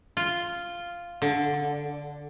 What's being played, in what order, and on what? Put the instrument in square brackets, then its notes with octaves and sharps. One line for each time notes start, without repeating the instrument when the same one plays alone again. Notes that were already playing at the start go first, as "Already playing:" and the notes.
[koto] F4
D3